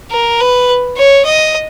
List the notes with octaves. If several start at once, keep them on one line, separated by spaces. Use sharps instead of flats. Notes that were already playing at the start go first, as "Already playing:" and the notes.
A#4
B4
C#5
D#5